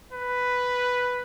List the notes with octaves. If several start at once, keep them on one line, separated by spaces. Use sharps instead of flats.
B4